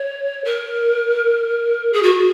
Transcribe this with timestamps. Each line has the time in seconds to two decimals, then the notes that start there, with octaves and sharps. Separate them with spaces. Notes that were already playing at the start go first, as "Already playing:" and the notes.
Already playing: C#5
0.45 A#4
1.93 G#4
2.03 F#4